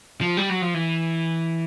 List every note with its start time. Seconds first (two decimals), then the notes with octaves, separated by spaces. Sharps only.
0.21 F3
0.37 G3
0.50 F#3
0.62 F3
0.74 E3